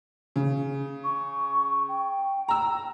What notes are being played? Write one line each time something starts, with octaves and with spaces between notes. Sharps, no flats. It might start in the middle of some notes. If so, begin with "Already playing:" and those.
C#3
C#6
G5
A#5 E6